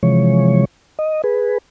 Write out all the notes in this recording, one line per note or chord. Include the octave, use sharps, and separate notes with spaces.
C3 E3 F3 G#3 C#5
D#5
G#4 B4